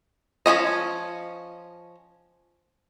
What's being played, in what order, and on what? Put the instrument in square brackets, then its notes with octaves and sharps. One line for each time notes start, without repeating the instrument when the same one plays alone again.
[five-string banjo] F3 A#3 C#4 D#5